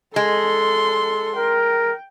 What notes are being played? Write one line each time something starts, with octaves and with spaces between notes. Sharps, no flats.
G#3 A4 C6
A#4 G5